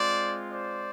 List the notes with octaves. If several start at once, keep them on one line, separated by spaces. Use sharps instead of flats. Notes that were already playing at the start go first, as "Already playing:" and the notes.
Already playing: G#3 C4 F4 C5 D5
C5 D5